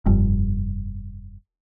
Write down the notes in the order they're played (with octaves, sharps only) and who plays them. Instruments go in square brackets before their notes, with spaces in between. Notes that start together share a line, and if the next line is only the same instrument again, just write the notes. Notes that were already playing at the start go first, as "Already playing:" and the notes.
[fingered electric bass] F1 G2